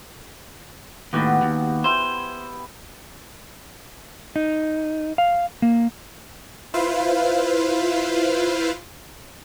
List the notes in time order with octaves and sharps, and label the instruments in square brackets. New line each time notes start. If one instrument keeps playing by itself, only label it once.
[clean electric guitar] D#2 A2 [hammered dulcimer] B3 F#4 G4
[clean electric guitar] D#2
[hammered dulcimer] E4 G5 [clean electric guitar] C5
[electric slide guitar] D#4
F5
A#3
[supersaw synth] E4 F4 B4 C5 F5